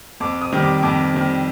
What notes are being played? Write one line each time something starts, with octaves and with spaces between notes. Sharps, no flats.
F2 D6
D#6
C3 D#3 G3
D6
F2 D6
C3 D#3 G3